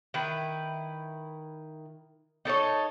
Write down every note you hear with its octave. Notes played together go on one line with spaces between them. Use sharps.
D#3 E4 B4
D#4 A4 A#4 C#5